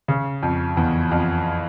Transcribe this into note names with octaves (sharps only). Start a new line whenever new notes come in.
C#3
F2
E2
F2